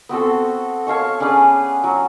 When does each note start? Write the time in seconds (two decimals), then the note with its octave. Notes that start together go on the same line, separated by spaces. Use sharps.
0.09 B3 C4 F#4 A4
0.87 C#5 F5 A5 C#6
1.20 C#4 D4 G#4 B4
1.84 F#3